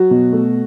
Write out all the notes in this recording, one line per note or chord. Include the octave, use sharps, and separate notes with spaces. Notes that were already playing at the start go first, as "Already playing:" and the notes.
Already playing: F#3 F#4
B2
A3